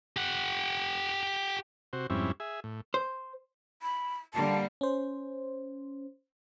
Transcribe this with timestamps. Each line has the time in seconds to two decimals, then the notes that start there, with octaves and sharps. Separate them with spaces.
0.17 G4 F#5
1.93 C3 F#4 C5
2.10 F2 G#2 G3 C4 C#4 E4
2.40 G#4 E5
2.64 A2
2.94 C5
3.82 B5
4.34 D3 G3 A#3 A5
4.81 C#4 C5